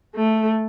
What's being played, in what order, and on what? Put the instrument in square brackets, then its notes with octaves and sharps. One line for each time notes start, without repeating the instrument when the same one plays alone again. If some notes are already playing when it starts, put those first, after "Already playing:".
[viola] A3